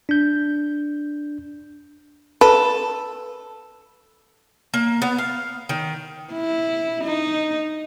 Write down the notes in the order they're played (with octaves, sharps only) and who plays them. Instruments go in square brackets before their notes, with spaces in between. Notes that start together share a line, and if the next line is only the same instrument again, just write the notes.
[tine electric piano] D4 G6
[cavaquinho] A4 [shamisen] B4
[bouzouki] A#3
B3
F5
D#3
[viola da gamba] E4
D#4